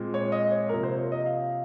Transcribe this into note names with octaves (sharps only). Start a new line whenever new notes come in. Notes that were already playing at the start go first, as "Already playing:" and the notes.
Already playing: A#2 G#3 C4
C#5
D#5
C#5
C3 F3 A#3 A#4
C5
C#5
D#5
F5